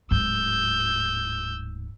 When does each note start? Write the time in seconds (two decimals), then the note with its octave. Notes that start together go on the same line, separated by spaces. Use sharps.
0.11 D1 G#2 E6 G6